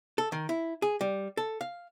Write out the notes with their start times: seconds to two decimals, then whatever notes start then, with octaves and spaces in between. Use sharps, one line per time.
0.18 A4
0.32 D#3
0.49 E4
0.82 G#4
1.01 G3
1.37 A4
1.61 F5